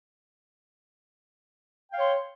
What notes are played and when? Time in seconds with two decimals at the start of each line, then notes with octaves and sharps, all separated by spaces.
1.91 G5
1.94 F5
1.98 C#5
2.01 C6